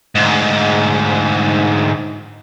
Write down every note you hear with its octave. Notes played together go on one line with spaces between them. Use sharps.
D2 G#2